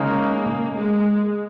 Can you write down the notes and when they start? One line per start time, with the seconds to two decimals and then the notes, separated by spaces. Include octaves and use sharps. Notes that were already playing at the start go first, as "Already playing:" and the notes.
Already playing: C#3 G#3 A#3 D#4 A#4
0.74 G#3